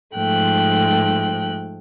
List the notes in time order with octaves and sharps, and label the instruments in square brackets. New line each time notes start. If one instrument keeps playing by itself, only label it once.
[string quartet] G#2 F3 A3 G5 F#6